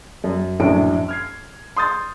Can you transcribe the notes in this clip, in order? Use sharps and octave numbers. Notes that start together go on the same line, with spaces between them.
F#2
A#1 F#2 A2 C#4 D7
F6 G#6 C7
C6 D#6 G6 A6